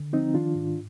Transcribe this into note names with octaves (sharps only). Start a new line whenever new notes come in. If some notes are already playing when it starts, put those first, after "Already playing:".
Already playing: D3
F3 C4 D#4
D#3 D4 F4
G#2